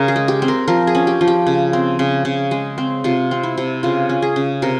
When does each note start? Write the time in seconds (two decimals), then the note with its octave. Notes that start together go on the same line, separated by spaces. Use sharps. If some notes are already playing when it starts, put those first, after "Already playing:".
Already playing: C#3 C#4 A#4
0.08 G#4
0.16 G#3
0.28 G4
0.42 C4
0.48 A#4
0.68 F3 A#4
0.87 G#4
0.95 C#4
1.07 G4
1.21 F3
1.28 G4
1.46 C#3
1.73 C4
1.99 C#3
2.25 C#3
2.51 G#3
2.78 C4
3.04 C3 F4
3.31 C4
3.43 E4
3.58 C3
3.83 C#3 F4
4.09 C#4
4.22 G#4
4.36 C#3
4.62 C3 A#4